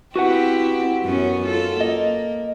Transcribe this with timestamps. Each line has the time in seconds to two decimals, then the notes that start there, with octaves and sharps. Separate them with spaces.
0.16 C4 E4 F#4 G4 B4 F#5
1.04 F#2 B3 C#4
1.46 F4 A4
1.81 A#3 D#5